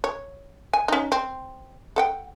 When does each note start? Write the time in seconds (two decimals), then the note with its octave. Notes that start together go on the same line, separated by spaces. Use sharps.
0.04 C#5
0.73 G#5
0.88 C#4 D#4
1.12 C4
1.96 A4 F#5 G5